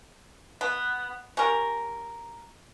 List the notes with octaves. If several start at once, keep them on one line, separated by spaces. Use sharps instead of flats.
B3
C#4 G4 A#4